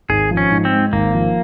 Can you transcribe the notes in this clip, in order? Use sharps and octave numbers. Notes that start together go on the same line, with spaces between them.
G#1 G#4
F3
C#4
G#2
C4
G#3
G#1 A#3
F3